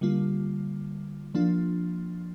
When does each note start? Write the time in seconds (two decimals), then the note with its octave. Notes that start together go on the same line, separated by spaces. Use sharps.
0.01 D3 G3 A#3 F4
1.34 F3 A#3 D4 F4